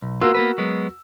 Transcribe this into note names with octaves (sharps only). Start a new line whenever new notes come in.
B1
A#3 B3 F4 F#4 A#4 E6
A#3 B3 B4
F#3 G#3 B3